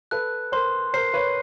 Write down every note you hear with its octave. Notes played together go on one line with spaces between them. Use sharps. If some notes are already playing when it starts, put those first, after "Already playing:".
A4 B4 F#6
A#4 C5 C6
A#4 C5 C7
B4 C#5